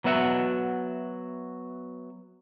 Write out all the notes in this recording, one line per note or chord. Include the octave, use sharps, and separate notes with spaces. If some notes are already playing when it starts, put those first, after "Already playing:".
F#3 B3 F#4 E5 F#5